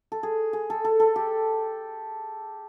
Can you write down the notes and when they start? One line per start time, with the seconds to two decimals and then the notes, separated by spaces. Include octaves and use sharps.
0.12 A4
0.23 G#4
0.53 G#4
0.70 A4
0.85 A4
1.00 A4
1.16 G4